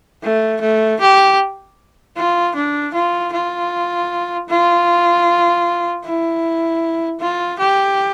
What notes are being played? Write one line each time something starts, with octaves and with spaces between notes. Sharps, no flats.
A3
A3
G4
F4
D4
F4
F4
F4
E4
F4
G4